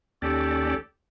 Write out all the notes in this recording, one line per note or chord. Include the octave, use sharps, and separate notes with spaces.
D#2 C#4 G4 A4 D5